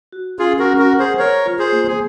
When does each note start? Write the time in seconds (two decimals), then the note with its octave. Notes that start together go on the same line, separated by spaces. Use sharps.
0.12 F#4
0.39 C#4 F4 G#4
0.59 F#4 A#4
0.66 C#4
0.79 F#4 A#4
0.93 F#5
0.99 G#4 C5
1.18 A#4 C5 C#5
1.46 F4
1.59 G#4 C5
1.72 A#3
1.88 G#4